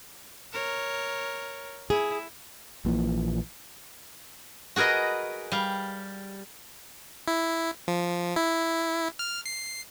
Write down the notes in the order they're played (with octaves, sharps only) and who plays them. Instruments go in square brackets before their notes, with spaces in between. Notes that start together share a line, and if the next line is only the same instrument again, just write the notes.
[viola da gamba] A#4 C#5
[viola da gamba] E4 [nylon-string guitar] G#4
[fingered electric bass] A#1 A#2 E3
[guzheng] F#4 G#4 A#4 B4 D#5
G3 F5
[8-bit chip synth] E4
F3
E4
F6
C7